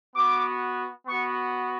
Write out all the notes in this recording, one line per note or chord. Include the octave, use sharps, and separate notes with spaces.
B3 F#4 D6
B3 F#4 C#6